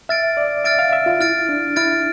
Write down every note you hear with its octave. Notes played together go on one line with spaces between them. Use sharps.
E5 F6 A6 D7
D5
E5 F6 A6 D7
F5
E5
F4
E4 F6 A6 D7
D4
E4 F6 A6 D7